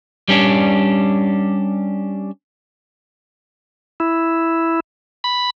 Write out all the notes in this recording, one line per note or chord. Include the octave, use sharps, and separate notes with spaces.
G3 C#4 D4
E4
B5